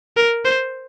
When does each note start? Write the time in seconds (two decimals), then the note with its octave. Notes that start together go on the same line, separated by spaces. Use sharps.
0.17 A#4
0.45 C5